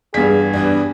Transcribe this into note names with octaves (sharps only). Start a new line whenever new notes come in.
E2 G2 G#4 F5 G#5 B6
E2 G3 B3 D4